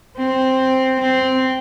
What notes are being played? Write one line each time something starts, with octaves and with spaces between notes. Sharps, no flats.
C4
C4